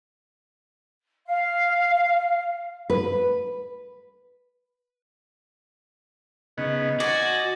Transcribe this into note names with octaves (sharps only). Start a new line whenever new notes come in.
F5
B4
C#3 B3 D#4
F#4 D5 D#5 G#5